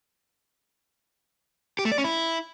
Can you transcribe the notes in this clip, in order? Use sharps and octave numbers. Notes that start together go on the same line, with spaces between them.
G4
A3
D5
C#4
E4